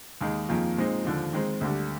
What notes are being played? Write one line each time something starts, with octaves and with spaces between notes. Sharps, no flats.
D#2 D#3 G#3 D#4
F2 D#3 A#3 F4 G#4
A#2 G#3 C4 D#4
D#2 D3 F3
D#3 G#3 C4
D2 D3 G3